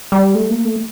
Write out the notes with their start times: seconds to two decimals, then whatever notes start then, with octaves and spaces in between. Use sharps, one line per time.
0.12 G3
0.35 A3
0.50 A#3
0.65 A3